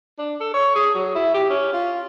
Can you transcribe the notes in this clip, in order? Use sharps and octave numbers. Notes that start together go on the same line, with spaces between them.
D4
A4
C#5
G#4
F#3
E4
G4
C#4
F4